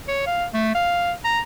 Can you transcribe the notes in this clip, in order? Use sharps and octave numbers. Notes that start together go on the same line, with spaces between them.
C#5
F5
A3
F5
A#5